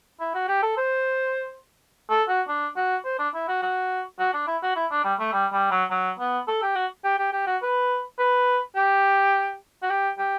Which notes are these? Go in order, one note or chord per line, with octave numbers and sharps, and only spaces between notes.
E4
F#4
G4
A4
C5
A4
F#4
D4
F#4
C5
D4
E4
F#4
F#4
F#4
D4
E4
F#4
E4
D4
G3
A3
G3
G3
F#3
F#3
B3
A4
G4
F#4
G4
G4
G4
F#4
B4
B4
G4
F#4
G4
G4